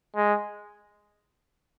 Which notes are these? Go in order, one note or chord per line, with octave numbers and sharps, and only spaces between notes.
G#3